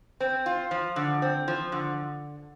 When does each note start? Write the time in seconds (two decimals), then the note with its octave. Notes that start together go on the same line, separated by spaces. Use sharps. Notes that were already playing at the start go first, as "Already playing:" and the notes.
0.20 C4
0.46 F4
0.71 F3
0.96 D3
1.22 C4
1.48 F3
1.72 D3